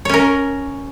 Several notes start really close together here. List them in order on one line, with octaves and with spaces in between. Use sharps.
C#5 C#4 A#4